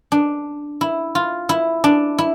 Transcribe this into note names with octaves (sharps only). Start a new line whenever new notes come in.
D4
E4
F4
E4
D4
E4